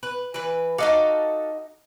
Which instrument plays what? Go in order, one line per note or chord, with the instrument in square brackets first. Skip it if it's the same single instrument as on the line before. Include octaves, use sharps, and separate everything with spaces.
[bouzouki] B4
E3 B4
[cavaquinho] D#4 D#5 D6 [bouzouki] F#4 A4 F5